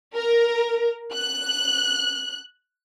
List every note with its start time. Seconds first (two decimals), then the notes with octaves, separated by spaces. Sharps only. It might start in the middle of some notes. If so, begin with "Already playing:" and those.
0.15 A#4
1.13 F#6